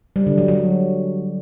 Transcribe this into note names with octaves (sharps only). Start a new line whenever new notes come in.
G3
D3
F#3
F#3